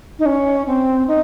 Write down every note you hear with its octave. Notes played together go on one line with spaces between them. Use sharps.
D#4
C#4
C4
D#4